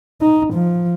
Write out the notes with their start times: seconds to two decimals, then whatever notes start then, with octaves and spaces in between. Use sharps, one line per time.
0.21 D#4
0.54 F3